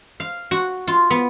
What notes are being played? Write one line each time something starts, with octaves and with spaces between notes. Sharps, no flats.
F5
F#4
F4
B3